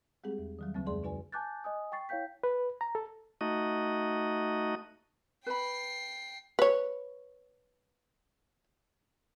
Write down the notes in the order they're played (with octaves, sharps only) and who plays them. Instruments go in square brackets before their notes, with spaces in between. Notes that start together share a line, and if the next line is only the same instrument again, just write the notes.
[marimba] G3 G#3 C4 G4 G#4
E2
D#3 F#3 G3
D2 C#3 F#3 A#3 C4
F2 G#3 G#4 D5 C6
C#3 D#4 F#4 B4 D5 G#5
[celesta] G#5 A5 D6 F#6 G6 A6
D#5 G#5 D#6
G5 C#6 A6 C7
E4 C#5 F5 G5 G6 B6
[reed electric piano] B4
A#5
A4
[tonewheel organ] A3 D#4 F#4 D#5
[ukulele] B4 B5 [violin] G5 C7
[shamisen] B4 C#5